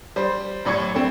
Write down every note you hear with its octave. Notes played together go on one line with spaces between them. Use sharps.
G3 C5
F#2 A2 D5 C#6 G#6 C#7
G3 A3 C4